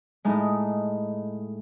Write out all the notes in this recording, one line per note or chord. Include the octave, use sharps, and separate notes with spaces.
A2 G#3 D#4